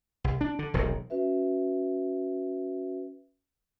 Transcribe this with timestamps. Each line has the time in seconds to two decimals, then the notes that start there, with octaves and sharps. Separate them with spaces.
0.24 C2
0.41 D4
0.59 D3
0.74 E1 B1 A2 C3
1.10 C#4 F#4 B4 E5